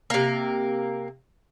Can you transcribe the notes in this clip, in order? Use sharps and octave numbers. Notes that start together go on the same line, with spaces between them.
C3 A#3